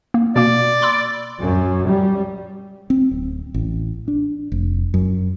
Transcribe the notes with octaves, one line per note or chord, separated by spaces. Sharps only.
A#3
B2 A#3 D5
B5 C6 E6
F#2
G3
C4
D1
A1
D4
F1
F#2